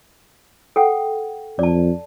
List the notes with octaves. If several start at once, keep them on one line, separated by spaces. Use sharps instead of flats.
A4 F#5 G5
F2 D5 A5